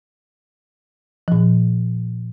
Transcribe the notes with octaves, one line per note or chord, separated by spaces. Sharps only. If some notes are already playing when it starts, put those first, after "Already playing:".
A#2 F3